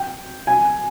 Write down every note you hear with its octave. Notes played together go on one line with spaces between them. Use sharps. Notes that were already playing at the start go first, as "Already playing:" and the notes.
Already playing: G5
G#5